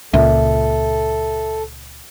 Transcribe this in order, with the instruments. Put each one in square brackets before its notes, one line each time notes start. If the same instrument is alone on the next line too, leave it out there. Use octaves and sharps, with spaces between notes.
[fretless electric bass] C#2 A#2 [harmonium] A4 [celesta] E5